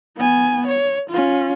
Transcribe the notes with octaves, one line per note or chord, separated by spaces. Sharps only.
B3 G#5
C#5
C#4 F4